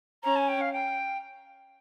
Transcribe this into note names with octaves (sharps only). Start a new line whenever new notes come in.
C#4 A#5
G#5
G5
F5
G5